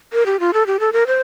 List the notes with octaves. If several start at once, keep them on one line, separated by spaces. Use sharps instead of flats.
A#4
G4
F4
A4
G4
A4
A#4
C5